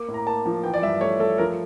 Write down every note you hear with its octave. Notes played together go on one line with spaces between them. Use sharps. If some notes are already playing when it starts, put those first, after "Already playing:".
Already playing: A#3 D6
A2
A#5
A#3 A5
F3
E3 G5
D5
G2 E5
A3 C#5
A3 A4
F3 A#4